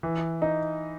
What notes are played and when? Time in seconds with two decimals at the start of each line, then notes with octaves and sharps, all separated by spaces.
0.03 E3
0.42 D#4